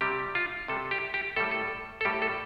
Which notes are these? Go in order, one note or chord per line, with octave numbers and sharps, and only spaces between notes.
C3 G3 G4
F4
C3 G3 A4
G4
G4
A2 G3 A4
A4
A4
A2 G3 G4
A4